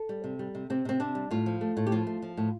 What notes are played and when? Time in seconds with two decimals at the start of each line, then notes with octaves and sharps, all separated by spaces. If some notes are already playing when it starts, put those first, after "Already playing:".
Already playing: A4
0.09 G3
0.24 C3
0.39 G3
0.55 C3
0.70 C3 C4
0.85 C3 C4
1.00 C3 D4
1.15 G3
1.31 A2 F4
1.46 F3
1.61 A3
1.77 A2
1.87 G4
1.92 F3 F4
2.07 A3
2.22 F3
2.37 A2